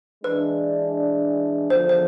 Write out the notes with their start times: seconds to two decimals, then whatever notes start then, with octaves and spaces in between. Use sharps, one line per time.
0.24 E3 G#3 D4 B4
1.70 E2 D3 F3 C5
1.89 C5